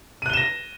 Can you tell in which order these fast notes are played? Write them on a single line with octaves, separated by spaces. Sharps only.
D#7 F#6 G7 E7 A#6